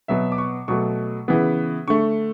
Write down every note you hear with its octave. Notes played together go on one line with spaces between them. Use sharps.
B2 F#3 B3 E5
D6
C#6
B2 F#3 A3 C#6
C#3 E3 B3
D3 A3 C#6